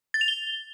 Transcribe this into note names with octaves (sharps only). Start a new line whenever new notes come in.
A6
F7
G7